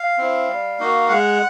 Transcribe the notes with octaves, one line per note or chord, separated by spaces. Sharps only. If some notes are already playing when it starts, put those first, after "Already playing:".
Already playing: F5
C4 E4
G3
A#3 D#4 F#4
G#3 F#5